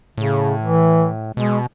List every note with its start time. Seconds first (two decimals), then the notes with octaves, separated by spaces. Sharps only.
0.18 A2 C#3
0.61 E3
1.37 B2 G#3